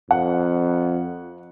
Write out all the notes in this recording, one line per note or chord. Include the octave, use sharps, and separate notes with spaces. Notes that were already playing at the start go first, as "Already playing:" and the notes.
F2 F#5